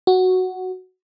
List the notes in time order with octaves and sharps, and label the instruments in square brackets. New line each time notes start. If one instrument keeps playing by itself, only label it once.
[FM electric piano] F#4